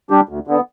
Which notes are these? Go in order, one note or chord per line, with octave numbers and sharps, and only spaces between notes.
G3 D4 G4
D2
D3 B3